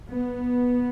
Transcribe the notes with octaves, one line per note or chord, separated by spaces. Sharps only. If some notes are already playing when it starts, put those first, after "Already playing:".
B3